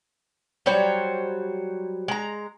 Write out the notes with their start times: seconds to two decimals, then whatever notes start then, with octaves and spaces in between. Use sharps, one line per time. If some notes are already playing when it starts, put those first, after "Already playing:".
0.66 F#3 G3 C5 C#5
2.08 G#3 A#5